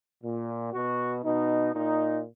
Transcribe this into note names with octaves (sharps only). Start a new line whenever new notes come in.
A#2
B2 F#4
B2 D#4
A#2 D#4